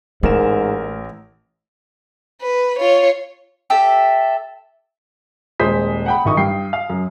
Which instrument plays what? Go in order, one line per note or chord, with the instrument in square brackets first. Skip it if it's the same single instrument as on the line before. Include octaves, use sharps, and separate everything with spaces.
[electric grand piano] A1 A#4 E7 [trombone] G#2 [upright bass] A3
[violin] B4
F4 C#5
[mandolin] G4 A4 E5
[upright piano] D#1 G#3 C5 D#6 B6
F#5 G5 B5
A1 D#3 D#5 C#6 D#6
G2 G5 C7
F5
F#2